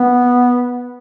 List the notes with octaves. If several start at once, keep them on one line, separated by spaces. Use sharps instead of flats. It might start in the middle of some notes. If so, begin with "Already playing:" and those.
Already playing: B3